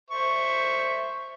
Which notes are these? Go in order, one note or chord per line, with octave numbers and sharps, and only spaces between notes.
C5 E5 C#6